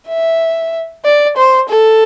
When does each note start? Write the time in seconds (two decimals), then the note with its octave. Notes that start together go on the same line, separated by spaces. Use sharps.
0.08 E5
1.04 D5
1.37 C5
1.69 A4